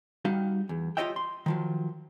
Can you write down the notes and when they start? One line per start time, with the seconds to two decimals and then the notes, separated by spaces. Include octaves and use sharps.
0.25 G3 D#4 F#4 G4 F5
0.69 E2
0.97 F4 G4 C#5 D#5 E5 G5
1.16 C6
1.46 D#3 F3 F#3